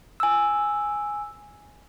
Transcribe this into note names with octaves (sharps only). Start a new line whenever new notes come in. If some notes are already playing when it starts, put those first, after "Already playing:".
G#5 E6